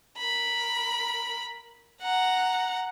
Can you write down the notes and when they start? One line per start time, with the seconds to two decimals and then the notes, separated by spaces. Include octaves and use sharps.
0.18 A#4 B5
2.02 F#5 A#5